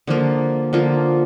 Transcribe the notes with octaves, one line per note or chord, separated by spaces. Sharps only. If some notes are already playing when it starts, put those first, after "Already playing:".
D3 F3 A#3 F4
D3 F3 A#3 F4